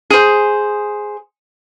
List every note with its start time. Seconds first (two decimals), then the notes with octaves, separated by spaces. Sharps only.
0.10 G#4 C5